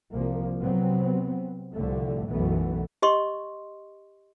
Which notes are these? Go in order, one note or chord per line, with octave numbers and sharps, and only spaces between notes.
C2 F3 A#3
C3 F#3 B3 C4
C2 A2 D3 F3 A3
B1 F#2 E3 F#3 A3 B3
G4 D#5 C6 C#6